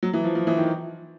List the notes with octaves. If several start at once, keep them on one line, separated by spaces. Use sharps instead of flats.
F#3
E3
F3
F3
E3
D#3